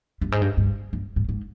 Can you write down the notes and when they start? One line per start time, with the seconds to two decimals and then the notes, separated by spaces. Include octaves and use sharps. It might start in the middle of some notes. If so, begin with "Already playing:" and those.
0.22 G2
0.32 G#2
0.41 G2
0.57 G2
0.93 G2
1.16 G#2
1.29 G#2